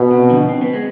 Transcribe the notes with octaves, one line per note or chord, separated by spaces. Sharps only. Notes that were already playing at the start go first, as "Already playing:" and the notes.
Already playing: B2
C3
D3 F3
C4
B3
G#3